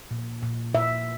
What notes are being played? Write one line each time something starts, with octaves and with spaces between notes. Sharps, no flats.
A#2
A#2
A#2 E5